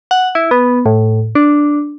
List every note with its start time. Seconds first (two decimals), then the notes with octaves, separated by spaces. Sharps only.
0.11 F#5
0.35 E4
0.51 B3
0.86 A2
1.35 D4